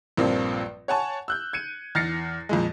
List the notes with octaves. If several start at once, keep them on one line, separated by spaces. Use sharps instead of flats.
A#1 G2 F3 A#3 C4
C#5 F#5 G#5 A5 C#6
E6 F#6 G6
G#6 C#7 D#7
E2 F6 A6 A#6 C7 C#7
F2 A#2 G#3